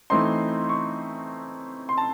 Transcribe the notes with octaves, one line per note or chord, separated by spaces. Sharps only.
E3 A3 C4 D#4 C6
C#6
C6
A5